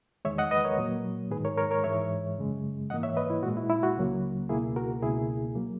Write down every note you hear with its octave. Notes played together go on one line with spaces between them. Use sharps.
E2 D#3 G#3 C#5 E5
D#5 F#5
B4 D#5
A#4 C#5
A#2 F#3 A#3
G#2 D#3 G#3 G#4 B4
A#4 C#5
A#4 C#5
A#4 C#5
G#2 E3 G#3 C#5 E5
F#2 C#3 G#3
G#2 E3 A#3 D#5 F#5
C#5 E5
B4 D#5
E4
A#2 G#3 F#4
E4
E4
F#4
C#2 C#3 F#3 A#3
C#2 B2 A#3 E4 G#4
F#4 A#4
C#2 B2 A#3 E4 G#4
F#3 A#3